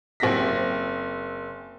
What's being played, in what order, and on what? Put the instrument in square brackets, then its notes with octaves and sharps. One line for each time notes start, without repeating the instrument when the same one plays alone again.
[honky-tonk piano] F#1 C4 A#6 B6